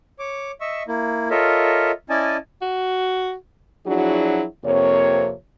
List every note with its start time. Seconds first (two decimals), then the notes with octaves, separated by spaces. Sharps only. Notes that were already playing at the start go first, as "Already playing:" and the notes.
0.19 C#5 D6
0.61 D#5 E5 C#6 E6
0.88 A#3 E4
1.30 F4 A4 A#4 C#5 D#5 E5
2.10 C#4 E4 D5 D#5 G#5 A5
2.61 F#4
3.86 F3 F#3 D4 E4 F#4 G#4
4.65 F2 C3 A#3 C#5